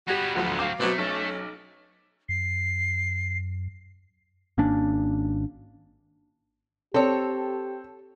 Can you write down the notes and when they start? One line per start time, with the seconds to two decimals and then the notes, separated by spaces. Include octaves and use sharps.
0.08 G3 B3 F#4 G4 G#6 A#6
0.35 D2 F3 F#3 F#4
0.59 F#3 C4 F5 D6
0.80 B2 F#3 A3 C4
0.98 B1 C#4
2.29 F#2 C7
4.58 G#1 A#3 C#4 D4
6.94 C4 G4 A4 C#5